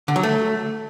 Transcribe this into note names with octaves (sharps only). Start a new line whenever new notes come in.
D3
F#3
A3